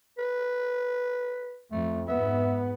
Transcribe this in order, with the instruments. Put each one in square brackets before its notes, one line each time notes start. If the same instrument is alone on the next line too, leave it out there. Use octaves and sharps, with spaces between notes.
[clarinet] B4
[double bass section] F2 [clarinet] A3
[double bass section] G#2 B3 [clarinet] E5